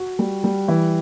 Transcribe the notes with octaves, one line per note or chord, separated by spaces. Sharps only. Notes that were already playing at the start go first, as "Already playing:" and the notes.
Already playing: F#4
G3
G3
E3